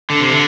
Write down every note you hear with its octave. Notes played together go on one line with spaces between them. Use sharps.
D3
C3
D3